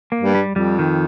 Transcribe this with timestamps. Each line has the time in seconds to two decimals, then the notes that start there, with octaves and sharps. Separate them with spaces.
0.12 A#3
0.20 G2
0.35 G3
0.50 F2
0.56 G3
0.79 D#3